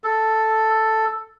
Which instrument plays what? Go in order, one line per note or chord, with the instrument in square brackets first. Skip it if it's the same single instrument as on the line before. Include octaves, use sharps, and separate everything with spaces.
[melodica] A4